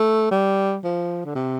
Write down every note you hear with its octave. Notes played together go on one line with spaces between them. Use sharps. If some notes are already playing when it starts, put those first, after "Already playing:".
Already playing: A3
G3
F3
D3
C3